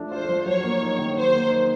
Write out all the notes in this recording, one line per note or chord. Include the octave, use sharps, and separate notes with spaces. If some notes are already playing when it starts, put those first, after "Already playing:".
Already playing: F3 A3 D4
F4 C5
F3
F#3 C#5
A#3
D#4
D#3
F#3 C5
A#3
D#4